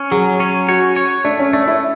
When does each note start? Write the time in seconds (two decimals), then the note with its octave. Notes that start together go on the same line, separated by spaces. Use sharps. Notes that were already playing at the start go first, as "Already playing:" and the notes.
Already playing: C#4
0.11 F#3 G#4
0.40 C#4
0.68 F#4 C#5
0.96 C#5
1.24 A3 D4
1.39 C#4
1.53 A3 D4
1.67 E4